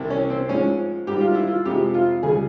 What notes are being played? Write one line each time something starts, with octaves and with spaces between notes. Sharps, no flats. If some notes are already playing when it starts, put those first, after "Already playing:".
Already playing: C2 C3 E3
C#4
C4
G#2 F3 G#3 C#4
G#2 G3 G4
F4
E4
F4
F2 C3 F3 G#3 G4
F4
C#2 C#3 G3 G#4